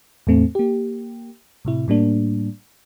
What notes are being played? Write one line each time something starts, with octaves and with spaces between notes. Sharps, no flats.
E2 A2 A3 C4
A#3 G4
A2 C3 E4
A2 G3 A#3 D4